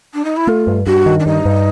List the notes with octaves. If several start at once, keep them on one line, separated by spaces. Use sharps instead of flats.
D4
D#4
E4
A3 F4
G2
G2 F#4
D#3
D4
G2 D#4
G2